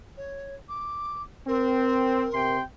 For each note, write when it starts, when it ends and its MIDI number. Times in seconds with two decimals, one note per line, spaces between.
0.17 0.55 73
0.69 1.22 86
1.47 2.26 60
1.47 2.55 70
2.32 2.60 48
2.32 2.60 79
2.32 2.60 84